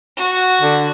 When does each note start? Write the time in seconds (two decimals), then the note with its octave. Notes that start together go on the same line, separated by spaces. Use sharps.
0.18 F#4
0.61 D3